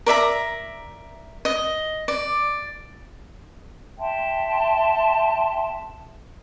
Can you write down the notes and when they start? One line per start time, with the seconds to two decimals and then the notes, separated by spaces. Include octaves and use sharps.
0.06 A#4 D5 E5 A#5
1.45 D#5
2.08 D5
3.98 E5 G5 A5 C6